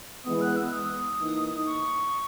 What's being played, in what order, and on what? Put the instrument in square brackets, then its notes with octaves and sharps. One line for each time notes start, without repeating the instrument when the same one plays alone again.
[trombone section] E3 G#3 B3 [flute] D#6
[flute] F#6
E6
D#6
[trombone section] E3 A#3 D#4
[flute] C#6